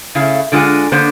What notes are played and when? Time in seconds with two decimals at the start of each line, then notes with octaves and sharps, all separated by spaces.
0.15 C#3 A3 E4 F5
0.52 D3 G#3 F4 G4 F#5 G#5
0.92 D3 A#3 B3 C5